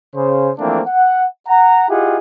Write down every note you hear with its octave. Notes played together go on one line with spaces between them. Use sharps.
C#3 C5
E3 F3 A3 A#3 C4 D4
F#5
F#5 A#5
E4 F4 G4 G#4 D#5 F#5